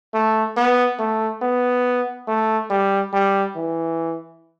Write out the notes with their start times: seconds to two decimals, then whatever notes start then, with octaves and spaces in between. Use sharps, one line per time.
0.14 A3
0.57 B3
0.99 A3
1.42 B3
2.28 A3
2.71 G3
3.13 G3
3.56 E3